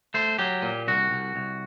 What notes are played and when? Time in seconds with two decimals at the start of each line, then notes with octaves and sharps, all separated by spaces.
0.14 A3 C5
0.39 F#3 G4
0.62 A#2
0.88 C2 F#4
1.11 C2
1.36 C2